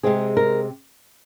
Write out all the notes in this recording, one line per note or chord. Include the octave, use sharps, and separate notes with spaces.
C3 G#3 C4 G#4
A#4